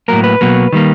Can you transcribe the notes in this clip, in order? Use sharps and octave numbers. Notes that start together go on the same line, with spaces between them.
A2 F#3 A#3 A#4
B4
B2 F#3 A#3
D#3 G3 A#3